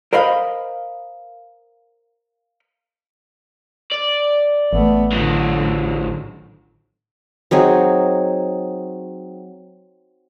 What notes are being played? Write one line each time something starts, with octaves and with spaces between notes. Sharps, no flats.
A#4 C5 D#5 F5 B5
D5
A1 A3 B3
A2 D3 D#3 F#3
F#3 C4 D#4 G#4